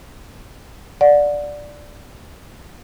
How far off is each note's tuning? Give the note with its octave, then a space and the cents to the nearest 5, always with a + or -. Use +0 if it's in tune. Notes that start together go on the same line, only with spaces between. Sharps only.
D5 +0 F#5 -25